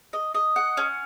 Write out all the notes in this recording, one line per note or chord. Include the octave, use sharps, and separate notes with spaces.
D#5
D#5
F#5
C#4